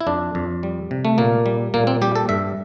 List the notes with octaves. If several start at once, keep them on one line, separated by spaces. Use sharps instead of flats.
E4
F2 D4
F2
G3
C3
A3
A#2 A#3
G3
A#2 A#3
C4
G3 G4
A4
G2 E5